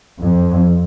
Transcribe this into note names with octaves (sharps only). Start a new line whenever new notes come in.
F2